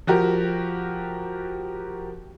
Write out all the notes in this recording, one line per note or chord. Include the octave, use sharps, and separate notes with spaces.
F3 F#4 G4 A#4